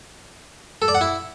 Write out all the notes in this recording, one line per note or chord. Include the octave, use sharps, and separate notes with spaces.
A4
D5
F#5
E4